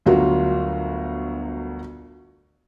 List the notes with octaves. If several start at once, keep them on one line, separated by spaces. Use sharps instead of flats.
G1 D2 F#3 F4 F#4 A#4